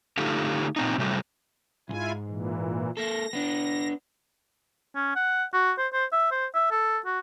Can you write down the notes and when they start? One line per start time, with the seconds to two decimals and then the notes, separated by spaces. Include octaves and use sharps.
0.18 D3 A3 D#4 F4 G4 A4
0.76 A#2 C4 D#4
0.98 C3 F#3 G3 A3
1.89 B1 G#2 E4 F4 G#5
2.27 A#2 E3
2.97 A#3 A4 A#6
3.33 B3 D4
4.95 C#4
5.16 F#5
5.53 F#4
5.78 C5
5.93 C5
6.12 E5
6.31 C5
6.54 E5
6.71 A4
7.06 F#4